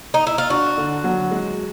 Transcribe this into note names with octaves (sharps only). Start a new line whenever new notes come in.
D#4
E4
F4
D4 F#4
D3
F#3
G#3